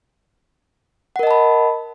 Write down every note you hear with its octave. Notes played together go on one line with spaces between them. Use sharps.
A#4 D#5 F#5 A5 B5